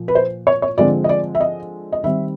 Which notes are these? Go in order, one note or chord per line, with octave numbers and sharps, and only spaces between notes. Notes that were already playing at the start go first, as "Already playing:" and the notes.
Already playing: A#2 F3
B4
C5
C#5
C#5
D3 F3 G#3 C4 D5
D#5
D5
E5
D#5
D#5
D#3 G3 C4 E5